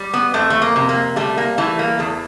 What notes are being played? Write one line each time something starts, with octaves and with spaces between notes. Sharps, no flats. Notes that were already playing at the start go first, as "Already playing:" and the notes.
Already playing: G3
B3
F2 A3
A3
A#3
C3
A#3
G3 A3
A#3
E3 A3
A#3
E2 A3